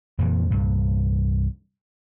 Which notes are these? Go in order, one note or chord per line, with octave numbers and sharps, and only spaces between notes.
F2 A#2 E3 F3
C2 G2 A#2